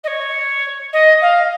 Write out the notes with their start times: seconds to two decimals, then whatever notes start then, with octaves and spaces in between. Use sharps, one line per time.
0.04 D#5
0.07 C#5
0.93 D#5
1.21 F5